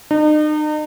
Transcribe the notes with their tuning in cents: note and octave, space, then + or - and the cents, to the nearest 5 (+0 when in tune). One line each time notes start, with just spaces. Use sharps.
D#4 -40